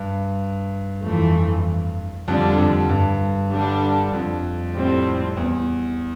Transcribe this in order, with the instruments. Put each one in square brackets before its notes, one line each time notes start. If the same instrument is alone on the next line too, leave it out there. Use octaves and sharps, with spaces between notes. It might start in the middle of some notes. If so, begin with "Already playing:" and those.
Already playing: [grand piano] G2
[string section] F2 E3 A3
[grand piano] F2 [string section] D3 G3 D4
[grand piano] F2
G2
[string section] D3 G3 D4
[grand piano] F2
[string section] A2 G3 C4
[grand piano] E2